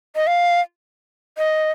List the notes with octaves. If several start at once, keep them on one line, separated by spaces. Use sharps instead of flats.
D#5
F5
D#5